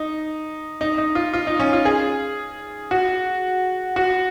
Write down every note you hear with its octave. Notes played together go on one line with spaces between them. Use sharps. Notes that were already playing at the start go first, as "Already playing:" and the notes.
Already playing: D#4
D#4
D#4
F4
F4
D#4
C#4
F4
G#4
F#4
F#4